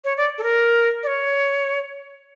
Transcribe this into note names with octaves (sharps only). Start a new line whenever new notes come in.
C#5
D5
A4
A#4
D5
C#5